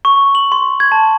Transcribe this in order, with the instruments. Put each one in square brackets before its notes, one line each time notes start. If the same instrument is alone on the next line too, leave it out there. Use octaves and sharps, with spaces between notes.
[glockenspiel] C#6
F#7
C6
G#6
A5